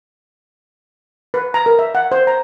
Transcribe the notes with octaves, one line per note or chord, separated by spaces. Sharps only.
B4
A#5
A#4
E5
F#5
C5
A#5